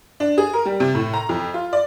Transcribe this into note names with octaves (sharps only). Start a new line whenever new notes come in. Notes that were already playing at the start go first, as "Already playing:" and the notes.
D4
G#4
A#4
G3
C3
A2
A#5
F2
F4
D5